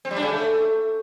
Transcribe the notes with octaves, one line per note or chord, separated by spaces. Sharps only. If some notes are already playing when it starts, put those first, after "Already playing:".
C4
G3
D4
C#3
A3